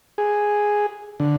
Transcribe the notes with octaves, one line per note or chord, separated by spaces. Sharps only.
G#4
D3